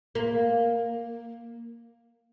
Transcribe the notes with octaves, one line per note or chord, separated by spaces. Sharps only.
A#3